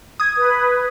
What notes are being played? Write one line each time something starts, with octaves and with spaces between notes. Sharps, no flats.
D#6 G#6
B4